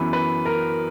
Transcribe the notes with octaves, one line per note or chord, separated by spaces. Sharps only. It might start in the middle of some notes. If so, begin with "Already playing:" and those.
Already playing: F#2 E3 B3 B4
B4
A#4